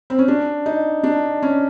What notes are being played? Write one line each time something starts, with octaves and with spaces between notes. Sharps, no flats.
C4
C#4
D4
D#4
D4
C#4